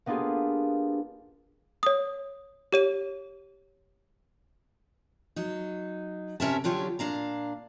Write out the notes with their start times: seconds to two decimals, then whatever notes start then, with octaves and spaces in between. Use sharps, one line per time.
0.06 A#3 B3 D4 F4 G4 G#4
1.83 C#5 D#6
2.73 G4 C#5 D#7
5.36 F#3 D#4
6.40 A2 C3 C#4 A#4 E5 A5
6.64 D3 F#3 F4 G4 C#5
6.99 A#2 D4 F5 A#5